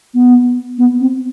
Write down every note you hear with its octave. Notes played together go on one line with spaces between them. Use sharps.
B3
B3
C4